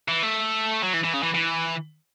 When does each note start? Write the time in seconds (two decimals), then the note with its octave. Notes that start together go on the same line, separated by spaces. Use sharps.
0.08 E3
0.23 A3
0.84 F#3
0.94 E3
1.04 E3
1.14 C#3
1.23 E3
1.34 E3